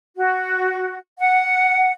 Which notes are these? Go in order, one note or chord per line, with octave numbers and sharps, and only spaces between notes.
F#4
F#5